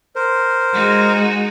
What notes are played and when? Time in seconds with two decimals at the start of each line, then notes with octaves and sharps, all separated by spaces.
0.16 A#4 C5
0.73 G#3 D#4 F#4